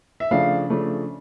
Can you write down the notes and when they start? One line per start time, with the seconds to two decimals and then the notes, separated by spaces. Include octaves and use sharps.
0.20 E5
0.31 C#3 F3 A3 D4 F5
0.70 C#3 F3 A3 D4